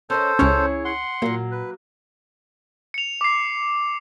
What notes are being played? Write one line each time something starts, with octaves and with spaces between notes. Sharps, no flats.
C#4 A4 A#4 C5 D#5
C#2 C#4 E4 G#4 C#5
F#5 C6
A#2 F#3 A#3
B4
C#7 F7
D6 C7